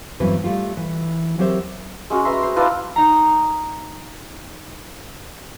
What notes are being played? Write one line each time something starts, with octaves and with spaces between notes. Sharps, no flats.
E2 G2 E3 F#3 C4 B4
G3 A3 F4
E3
F#3 C4 G4 A#4 C5 E5
G#3 C#4 F#4
B4 E5 A#5 C6
C5 C6
D4 E4 F4 B4
D#4 A#5